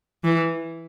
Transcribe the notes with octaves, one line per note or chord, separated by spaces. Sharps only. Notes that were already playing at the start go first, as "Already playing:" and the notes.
E3